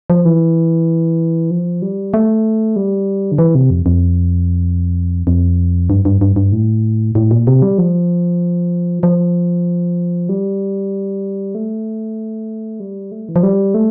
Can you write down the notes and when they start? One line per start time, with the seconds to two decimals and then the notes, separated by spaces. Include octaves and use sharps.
0.10 F3
0.25 E3
1.51 F3
1.82 G3
2.14 A3
2.76 G3
3.32 D3
3.38 E3
3.55 C3
3.70 F2
3.86 F2
5.27 F2
5.90 G2
6.05 G2
6.21 G2
6.36 G2
6.52 A2
7.15 A2
7.31 A#2
7.47 C3
7.62 G3
7.78 F3
9.03 F3
10.29 G3
11.55 A3
12.80 G3
13.12 A3
13.29 E3
13.36 F3
13.43 G3
13.74 A3